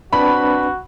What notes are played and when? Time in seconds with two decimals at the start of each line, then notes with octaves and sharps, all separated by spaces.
0.13 C4 D4 F#4 B4 B5